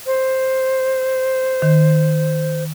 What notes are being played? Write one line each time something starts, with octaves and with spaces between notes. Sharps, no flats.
C5
D#3